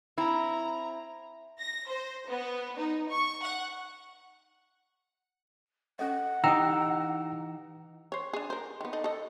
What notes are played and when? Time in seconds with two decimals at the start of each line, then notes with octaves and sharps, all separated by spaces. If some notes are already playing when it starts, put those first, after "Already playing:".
0.18 C4 E4 A#5
1.59 A#6
1.89 C5
2.28 B3
2.78 D#4
3.11 C#6
3.42 F#5
5.99 C#4 A4 D#5 F#5
6.44 E3 D#4 G4 G5 A#5 D#6 E6
8.12 C5 C#5
8.33 D4 G#4
8.50 A#4 C5
8.81 D#3 B3
8.93 D#4 A4 D#5
9.04 A4 D#5